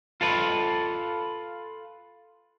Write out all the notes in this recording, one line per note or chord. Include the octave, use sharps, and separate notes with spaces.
F4 A4 B4